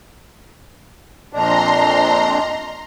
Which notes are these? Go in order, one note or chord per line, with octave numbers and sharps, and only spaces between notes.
F2 A#2 D4 D#5 A#5 C6